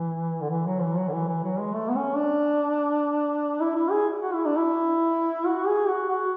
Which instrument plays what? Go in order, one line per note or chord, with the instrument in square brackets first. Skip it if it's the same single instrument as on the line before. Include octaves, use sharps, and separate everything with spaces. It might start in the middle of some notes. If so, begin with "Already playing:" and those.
Already playing: [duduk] E3
D3
E3
F#3
E3
F#3
D3
E3
E3
F#3
G#3
A3
B3
C#4
D4
E4
E4
G#4
F#4
E4
D4
E4
F#4
G#4
F#4
F#4